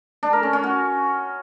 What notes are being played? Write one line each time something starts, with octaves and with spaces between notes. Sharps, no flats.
D4
A#4
C#4
C#4
F#4